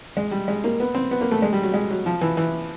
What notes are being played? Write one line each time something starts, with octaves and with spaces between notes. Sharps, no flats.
G#3
G3
G#3
A#3
B3
C4
B3
A#3
A3
G#3
G3
F#3
G#3
F#3
F3
E3
E3